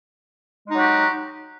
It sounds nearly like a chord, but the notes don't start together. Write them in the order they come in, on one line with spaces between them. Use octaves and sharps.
G#3 D#4 F#3 F#4 G4